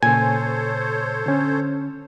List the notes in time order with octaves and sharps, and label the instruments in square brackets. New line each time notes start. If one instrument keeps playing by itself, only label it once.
[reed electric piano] A#2 C#3 [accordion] A4 C5 C#5 [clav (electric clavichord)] G#5
[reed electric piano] D3 C#4